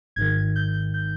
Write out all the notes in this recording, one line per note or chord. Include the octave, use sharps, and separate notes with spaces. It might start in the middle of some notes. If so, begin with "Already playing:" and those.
G#1 G#2 D#3 G#6
G6
G6